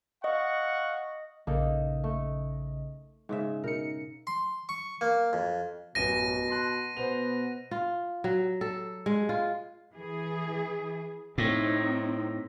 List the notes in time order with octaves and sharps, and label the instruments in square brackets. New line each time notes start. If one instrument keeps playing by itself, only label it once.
[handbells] D#5 [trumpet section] F5 F#5 C#6
[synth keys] A#1 C#3 D#5 [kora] A#3 D#4 A4
[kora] A3
G#2 C#3 E5
[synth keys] B2 D#4 C#7 [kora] A#4
[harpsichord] C6
C#6
A#3
F2
[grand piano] A1 F#2 B4 [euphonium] B2 [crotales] A#6 D#7
[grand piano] A5 C6 F#6
[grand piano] B2 C5 F7 [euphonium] B3
[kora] F4
F#3
A4
G#3
F4
[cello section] E3 G#4
[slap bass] A2 [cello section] C4 D#4